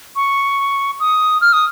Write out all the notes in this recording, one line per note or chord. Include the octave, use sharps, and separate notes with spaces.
C#6
D#6
F6
D#6